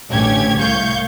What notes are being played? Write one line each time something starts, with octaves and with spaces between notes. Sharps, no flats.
A1 D2 C#4 G4 G#6
C2 A2 F5 C#6 G6 G#6